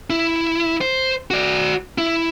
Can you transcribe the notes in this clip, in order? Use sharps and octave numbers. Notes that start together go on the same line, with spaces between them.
E4
C5
F#4 D5
E4